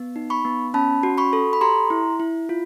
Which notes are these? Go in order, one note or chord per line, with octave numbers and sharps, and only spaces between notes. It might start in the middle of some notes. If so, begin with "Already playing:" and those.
Already playing: B3
D#4
B5 C#6
B3
C#4 A5 B5
F#4
B5 C#6
A4
B5
G4 A#5 C6
E4
E4
F4